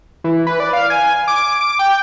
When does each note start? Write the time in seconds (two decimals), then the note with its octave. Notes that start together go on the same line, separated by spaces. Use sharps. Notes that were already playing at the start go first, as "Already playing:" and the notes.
0.24 E3
0.47 B4
0.60 D5
0.73 F5
0.90 G#5
1.28 D6
1.61 D6
1.79 G5